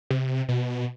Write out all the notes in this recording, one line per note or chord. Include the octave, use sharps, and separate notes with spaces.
C3
B2